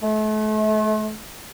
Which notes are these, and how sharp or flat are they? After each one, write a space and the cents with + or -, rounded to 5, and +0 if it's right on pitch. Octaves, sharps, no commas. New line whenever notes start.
A3 -40